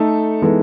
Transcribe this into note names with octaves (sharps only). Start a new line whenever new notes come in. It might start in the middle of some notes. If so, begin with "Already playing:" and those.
Already playing: A3 D#4 A4
E3 G#3 B3 D#4 A4